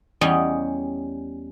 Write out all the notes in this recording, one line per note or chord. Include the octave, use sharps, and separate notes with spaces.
E2 G3 C#4 D#5